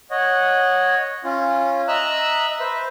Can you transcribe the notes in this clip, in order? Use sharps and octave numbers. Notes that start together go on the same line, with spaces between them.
C#5 D#5 F#5
C#4 F4
D#5 E5 A#5 E6 F#6
B4 C5 E5